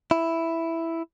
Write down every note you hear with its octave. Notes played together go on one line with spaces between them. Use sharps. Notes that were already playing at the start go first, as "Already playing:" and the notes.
E4